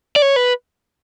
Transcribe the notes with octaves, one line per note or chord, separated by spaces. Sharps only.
D5
C#5
B4